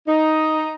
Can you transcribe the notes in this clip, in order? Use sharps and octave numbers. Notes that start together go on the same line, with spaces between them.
D#4